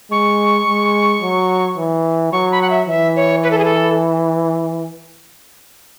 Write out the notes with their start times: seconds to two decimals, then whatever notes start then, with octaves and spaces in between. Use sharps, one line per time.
0.11 G#3 C#6
0.67 G#3
1.22 F#3
1.78 E3
2.32 F#3 C#6
2.52 B5
2.61 F#5
2.70 E5
2.89 E3 E5
3.16 C#5
3.43 B4
3.51 A4
3.59 G#4
3.65 A4